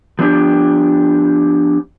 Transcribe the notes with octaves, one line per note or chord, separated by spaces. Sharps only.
F3 B3 D4 G4